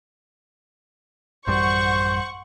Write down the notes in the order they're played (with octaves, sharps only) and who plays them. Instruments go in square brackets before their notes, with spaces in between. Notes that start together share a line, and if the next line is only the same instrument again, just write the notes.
[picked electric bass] A1 F#2 G3 [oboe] C5 [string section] F#5 C#6